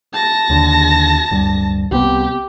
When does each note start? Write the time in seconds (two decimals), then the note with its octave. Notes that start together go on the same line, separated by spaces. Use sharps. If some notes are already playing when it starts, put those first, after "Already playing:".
0.13 A5 A#6
0.50 D#2 D3
1.31 D1 G2
1.91 C2 C3 B3 G4